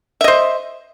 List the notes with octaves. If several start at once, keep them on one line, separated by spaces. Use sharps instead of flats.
C5 D#5 E5